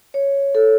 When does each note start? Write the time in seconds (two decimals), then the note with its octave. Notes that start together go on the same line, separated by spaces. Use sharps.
0.14 C#5
0.55 A4